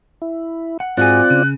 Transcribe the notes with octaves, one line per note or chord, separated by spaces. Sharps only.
E4
F#5
G#2 C4 F4 F#4 G#4 D5 F#6
C#3